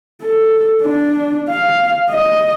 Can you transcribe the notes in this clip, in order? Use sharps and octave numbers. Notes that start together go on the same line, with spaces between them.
A4
D4
F5
D#5